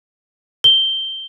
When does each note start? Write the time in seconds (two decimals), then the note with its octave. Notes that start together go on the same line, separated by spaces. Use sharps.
0.64 G7